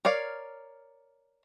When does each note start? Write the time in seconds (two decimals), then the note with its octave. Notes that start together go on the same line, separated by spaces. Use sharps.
0.05 A#4 C#5 D5 F5